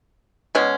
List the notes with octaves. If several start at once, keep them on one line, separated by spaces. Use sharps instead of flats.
B2 G#3 C#4